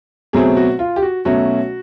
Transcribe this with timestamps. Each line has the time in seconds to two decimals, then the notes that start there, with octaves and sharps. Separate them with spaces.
0.33 B2 F#3 A3 C4 G#4
0.57 F#4
0.79 F4
0.96 G4
1.02 F#4
1.25 B2 F#3 A3 C#4 F#4